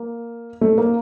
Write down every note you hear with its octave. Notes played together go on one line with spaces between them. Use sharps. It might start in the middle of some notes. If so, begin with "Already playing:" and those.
Already playing: A#3
A3
A#3